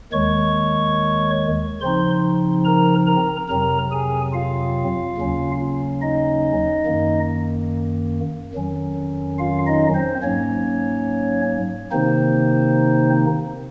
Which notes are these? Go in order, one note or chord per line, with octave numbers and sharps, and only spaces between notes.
D#2 D#3 G#3 C#5 C#6
C#3 F3 C4 D#4 C5 C6
A#4 A#5
A#4 A#5
F2 C3 F#3 C4 A#4 A#5
G#4 G#5
F4 F5
D#2 C#3 F#3 C#4
D#4 D#5
F#2 D#3 A#3
F2 D#3 F#3 C#4
F4 F5
D#4 D#5
C4 C5
G#2 F#3 A#3 C#4 C#5
C3 D#3 A#3 C4 D#4 C5